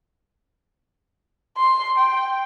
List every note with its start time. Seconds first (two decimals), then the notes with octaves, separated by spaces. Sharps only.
1.57 C6
1.98 G5